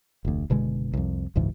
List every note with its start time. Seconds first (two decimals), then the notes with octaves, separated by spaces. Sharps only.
0.25 F1 D2
0.50 F#1 B2 D3 G#3
0.93 C2 F2
1.36 F#1 C#2 G#2 E3